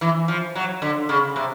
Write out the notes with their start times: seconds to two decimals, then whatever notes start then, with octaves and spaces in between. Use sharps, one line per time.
0.01 E3
0.28 F3
0.56 F#3
0.82 D3
1.09 C#3
1.36 C3